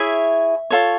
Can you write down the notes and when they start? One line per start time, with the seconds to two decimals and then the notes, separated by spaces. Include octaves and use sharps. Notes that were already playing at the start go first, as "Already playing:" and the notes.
Already playing: E4 G#4 C#5 E5
0.71 F4 A4 C#5